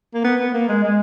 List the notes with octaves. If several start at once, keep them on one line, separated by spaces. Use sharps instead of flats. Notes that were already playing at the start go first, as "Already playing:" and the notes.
A#3
B3
B3
A#3
G#3
G#3